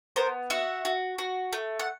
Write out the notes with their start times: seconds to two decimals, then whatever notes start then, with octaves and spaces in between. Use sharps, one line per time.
0.16 B3 A#4 C5
0.50 F#4 E5 F#5
0.85 F#4
1.18 F#4
1.53 A3
1.79 F#5